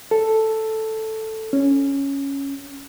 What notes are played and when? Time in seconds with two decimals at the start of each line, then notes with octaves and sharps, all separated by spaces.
0.11 A4
1.53 C#4